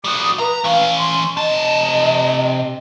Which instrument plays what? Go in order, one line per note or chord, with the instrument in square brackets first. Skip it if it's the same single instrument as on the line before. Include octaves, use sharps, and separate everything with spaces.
[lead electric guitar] G3 F#4 [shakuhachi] D#6
[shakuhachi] B4 [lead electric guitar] A#5
[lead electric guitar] E3 C#4 [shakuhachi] F5
[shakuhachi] C6
[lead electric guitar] C3 A5 [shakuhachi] D#5